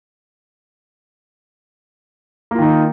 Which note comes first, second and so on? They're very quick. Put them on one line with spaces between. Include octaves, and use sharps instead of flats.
A#3 F4 D#3 D#4